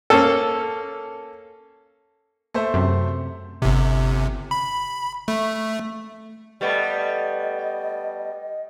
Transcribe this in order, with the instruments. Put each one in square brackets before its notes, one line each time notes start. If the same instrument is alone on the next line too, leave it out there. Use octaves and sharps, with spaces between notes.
[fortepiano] A#3 C#4 A4
[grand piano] A3 C5 E5
[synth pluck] F#2 C3
[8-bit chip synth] G1 C3
B5
A3
[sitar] G3 A3 B3 [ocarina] D#5